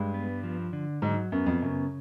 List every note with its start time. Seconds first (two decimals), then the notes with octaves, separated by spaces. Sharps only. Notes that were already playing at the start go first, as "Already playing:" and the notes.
Already playing: G2 G#3
0.14 B3
0.43 F3
0.73 D3
1.02 G#2 F#3
1.32 F#2 B3
1.46 F2
1.62 F#2 C#3